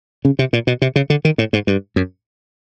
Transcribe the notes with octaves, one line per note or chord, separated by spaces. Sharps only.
C#3
C3
A#2
B2
C3
C#3
D3
D#3
A2
G#2
G2
F#2